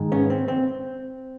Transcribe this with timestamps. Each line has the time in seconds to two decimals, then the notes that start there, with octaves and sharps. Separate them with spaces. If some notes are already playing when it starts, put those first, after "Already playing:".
Already playing: G#2 D#3 G#3
0.12 B3 C#4
0.30 C4
0.48 C4